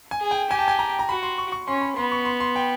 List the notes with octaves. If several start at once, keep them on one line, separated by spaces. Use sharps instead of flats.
G#5
G#4
G5
G4 G#5
A5
G#5
A#5
A#5
F#4 B5
C6
C#6
C#6
C#4 C6
B5
B3 C6
C#6
C6
C6
G5